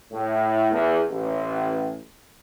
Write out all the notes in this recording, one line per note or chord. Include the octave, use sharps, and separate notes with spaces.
A2
E2
A1